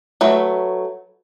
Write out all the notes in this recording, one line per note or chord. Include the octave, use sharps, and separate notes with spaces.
F#3 A3 B4